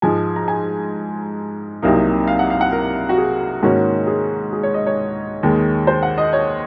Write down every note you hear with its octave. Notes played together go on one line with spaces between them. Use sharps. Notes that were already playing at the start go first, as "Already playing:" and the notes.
G#2 F3 G#3 G#5
A#5
G#5
C2 C3 F#3 A#3 D#4 F5
F5
F#5
F5
F#5
A#4
F#4
G#4
G#2 D#3 A#3 C#4 F#4
G#4
G#4
C#5
D#5
C#5
D#2 D#3 G#3
C5
F#5
D#5
C#5